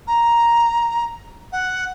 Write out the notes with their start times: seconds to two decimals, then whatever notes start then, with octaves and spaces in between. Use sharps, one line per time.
0.07 A#5
1.52 F#5